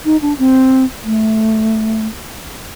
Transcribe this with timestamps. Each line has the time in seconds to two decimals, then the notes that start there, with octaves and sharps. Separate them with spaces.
0.05 D#4
0.22 D4
0.39 C4
1.04 A3